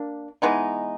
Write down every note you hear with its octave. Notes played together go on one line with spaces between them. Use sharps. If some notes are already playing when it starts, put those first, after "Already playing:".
Already playing: A#3 D4
E3 G#3 B3 D#4